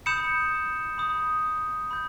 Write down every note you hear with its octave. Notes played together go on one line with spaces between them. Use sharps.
B5 D#6 G6 C#7 E7
B5 D#6 G6
B5 G6